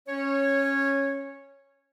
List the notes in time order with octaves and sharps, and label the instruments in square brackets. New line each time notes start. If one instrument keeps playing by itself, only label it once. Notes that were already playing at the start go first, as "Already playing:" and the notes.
[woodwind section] C#4 C#5